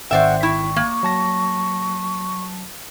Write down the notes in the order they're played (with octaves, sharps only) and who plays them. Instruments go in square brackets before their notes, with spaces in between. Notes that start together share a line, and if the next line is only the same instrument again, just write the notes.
[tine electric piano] G#1 G5 [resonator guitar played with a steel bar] C5 D5 E5 [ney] F#5
[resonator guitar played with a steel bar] E4 [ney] C#6
[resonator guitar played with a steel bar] A#3
[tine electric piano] F#3 A5 A#6